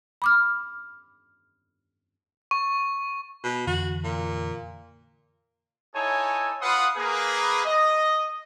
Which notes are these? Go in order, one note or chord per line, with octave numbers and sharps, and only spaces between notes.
B5 D6 F6
C#6
B2
F2 D3 E3 F#4
A#2
D#4 E4 A4 C#5 G#5
F4 B4 F5 F#5 C6 D#6
A#3 G#4 B4
D#5